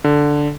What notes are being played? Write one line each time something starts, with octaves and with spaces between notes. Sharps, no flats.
D3